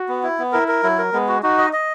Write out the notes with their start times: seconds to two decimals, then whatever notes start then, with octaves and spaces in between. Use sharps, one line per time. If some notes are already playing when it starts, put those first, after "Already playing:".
Already playing: F#4
0.08 B3
0.23 E4
0.38 B3
0.53 E4 A#4
0.68 A#4
0.83 F#3 E4
0.98 A#4
1.13 G#3 B3
1.28 F#4
1.43 D#4 F#4
1.58 D#5
1.73 D#5